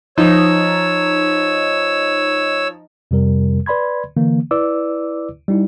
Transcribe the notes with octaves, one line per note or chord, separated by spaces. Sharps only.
F3 D#4 C#5 E6
F2 C3 G3 A#4
B4 D5 B5 C6 G#6
D3 E3 A#3
E4 B4 D5 D6 E6
G3 D#4 E4